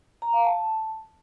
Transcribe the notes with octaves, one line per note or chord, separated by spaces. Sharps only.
A#5
F5
A5